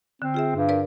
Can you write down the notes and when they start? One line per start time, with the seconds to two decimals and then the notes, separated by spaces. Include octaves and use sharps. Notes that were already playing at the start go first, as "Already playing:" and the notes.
0.22 D3 C4
0.34 F4 G#4 E5
0.55 G2
0.69 A#4 B4 D5